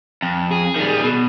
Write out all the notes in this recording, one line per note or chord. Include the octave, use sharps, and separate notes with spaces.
F2
G#4
D#3 G3
B2